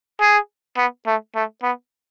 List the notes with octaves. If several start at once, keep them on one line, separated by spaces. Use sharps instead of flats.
G#4
B3
A3
A3
B3